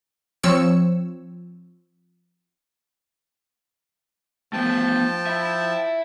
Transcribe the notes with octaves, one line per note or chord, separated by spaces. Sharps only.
F3 C4 C#5 E6 C#7
F3 A3 B3 G5 A5
E5 B5